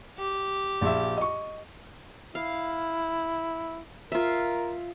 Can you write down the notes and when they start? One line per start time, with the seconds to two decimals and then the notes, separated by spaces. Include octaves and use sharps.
0.18 G4
0.81 A#1 E5
1.17 D#5 C#6
2.35 E4 F5
4.12 F4 A#4 E5